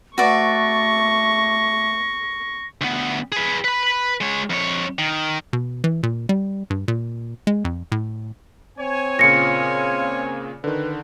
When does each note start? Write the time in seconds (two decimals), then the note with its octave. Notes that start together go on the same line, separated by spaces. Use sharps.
0.18 A3 F#4 B4 D5 C#6 A#6
2.81 D2 B3
3.32 G#4 B4
3.64 B4 B5
4.21 G#3 C#5
4.50 F2 C#5
4.99 D#3
5.53 B2
5.84 E3
6.03 A#2
6.29 G3
6.70 G2
6.88 A#2
7.47 G#3
7.65 F2
7.92 A2
8.78 C4 C#5 G#5
9.19 A#2 C#3 F4 A#6 C#7
10.64 D3 D#3 B4